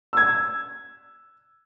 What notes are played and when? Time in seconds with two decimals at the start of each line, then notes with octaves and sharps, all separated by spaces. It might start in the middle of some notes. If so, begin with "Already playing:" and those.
0.13 E6 G#6